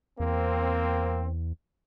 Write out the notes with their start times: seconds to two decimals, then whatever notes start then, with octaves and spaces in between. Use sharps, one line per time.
0.20 E2 A#3 C4